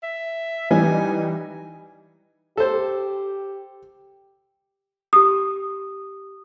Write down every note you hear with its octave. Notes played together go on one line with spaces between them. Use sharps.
E5
E3 G3 D#4 G#5
G4 A4 C5
G4 D#6